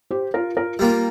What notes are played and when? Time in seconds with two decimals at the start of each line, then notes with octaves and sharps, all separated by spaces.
0.11 G4 C5
0.34 F4 A#4
0.57 F4 A#4
0.79 G3 A#3 F4 A#4